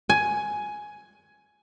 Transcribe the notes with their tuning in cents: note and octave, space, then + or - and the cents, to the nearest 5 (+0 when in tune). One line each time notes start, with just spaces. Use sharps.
G#5 +10